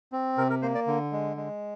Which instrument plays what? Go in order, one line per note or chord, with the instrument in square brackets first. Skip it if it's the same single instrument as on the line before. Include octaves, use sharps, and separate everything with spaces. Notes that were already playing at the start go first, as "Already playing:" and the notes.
[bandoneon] C4
C3 A#4
A#4
A#3 C5
D5
D3
G#3
G#3